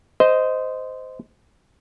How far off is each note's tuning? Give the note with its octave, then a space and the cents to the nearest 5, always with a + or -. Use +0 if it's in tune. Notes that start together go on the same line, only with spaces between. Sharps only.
C5 -15 D#5 +5